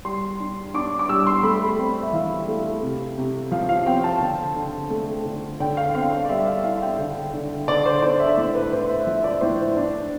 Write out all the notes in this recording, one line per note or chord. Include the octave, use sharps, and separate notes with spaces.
G3 C6
D4
D4 D6
D6
G3 E6
C6
A3 B5
C4
E5
E3 F5
A3
C3
C3
F3 F5
F5
C4 G5
A5
D3
D3
A3
D3
D3 G5
F5
C4 F5
F5
D5
G3 E5
F5
E4 F5
G5
D3
D3
D3 D5
C5
D4 D5
E5
A2 D5
B4
A2 C5
E5
F3 E5
D5
A2 C5
D4